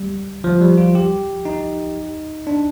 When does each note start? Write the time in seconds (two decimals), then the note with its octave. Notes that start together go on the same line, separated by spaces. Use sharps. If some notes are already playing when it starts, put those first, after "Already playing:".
Already playing: G3
0.44 F3
0.61 G3
0.78 F4
0.95 G4
1.45 D#4
2.47 D4